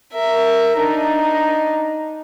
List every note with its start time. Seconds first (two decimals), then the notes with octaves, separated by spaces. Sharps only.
0.14 A#4 E5
0.78 D4 D#4